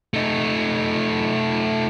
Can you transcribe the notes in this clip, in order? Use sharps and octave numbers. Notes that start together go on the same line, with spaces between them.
A3 D#4